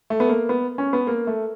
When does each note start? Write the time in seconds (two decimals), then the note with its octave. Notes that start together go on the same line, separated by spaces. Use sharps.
0.10 A3
0.20 B3
0.29 A#3
0.49 B3
0.78 C#4
0.93 B3
1.07 A#3
1.27 A3